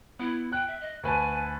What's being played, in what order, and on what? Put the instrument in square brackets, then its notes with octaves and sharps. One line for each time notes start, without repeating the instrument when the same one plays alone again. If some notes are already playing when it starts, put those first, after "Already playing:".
[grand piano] B3 [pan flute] E4
[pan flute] G5 [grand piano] F#6
[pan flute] E5
D#5
[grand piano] D2 B4 A5 [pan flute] G#5